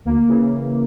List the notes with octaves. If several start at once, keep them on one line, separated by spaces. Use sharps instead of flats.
D2 A#3
C#3 E3